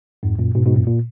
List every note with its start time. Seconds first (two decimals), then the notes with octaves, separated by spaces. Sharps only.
0.23 F2 G#2
0.39 F#2 A#2
0.55 G#2 B2
0.66 G#2 B2
0.76 F#2 A#2
0.87 A#2